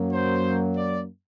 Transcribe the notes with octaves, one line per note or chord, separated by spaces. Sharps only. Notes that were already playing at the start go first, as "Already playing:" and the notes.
Already playing: F#2 F#3 A#3
C5
D5